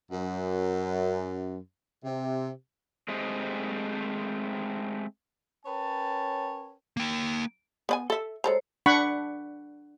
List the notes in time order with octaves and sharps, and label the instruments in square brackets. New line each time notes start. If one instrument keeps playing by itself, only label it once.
[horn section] F#2
C3
[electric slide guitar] G#3 A3 C4 G4 C5 D#5
[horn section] C#4 A#4 B4 C#5 G5 A5
[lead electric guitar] A#3 G5
[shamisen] B3 D5 G#5
A4 E5
[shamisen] G#3 A4 A#5 [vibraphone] C5 C#5
[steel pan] D4 F#5 B5 C#6